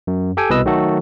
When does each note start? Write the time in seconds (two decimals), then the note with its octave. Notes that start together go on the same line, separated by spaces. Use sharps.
0.07 F#2
0.37 G4 A4 G5 G#5
0.50 C2 B2 B4 D#5 E6
0.66 D#3 F#3 A3 F#4 A4